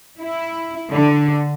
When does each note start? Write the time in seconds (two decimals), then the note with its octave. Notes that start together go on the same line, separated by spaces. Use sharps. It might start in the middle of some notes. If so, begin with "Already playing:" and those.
0.19 E4
0.93 D3